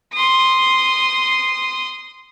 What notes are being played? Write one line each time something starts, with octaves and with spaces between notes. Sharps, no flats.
C6 D#6